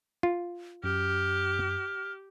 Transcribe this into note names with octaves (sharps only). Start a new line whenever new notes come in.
F4
F#2 G4 F6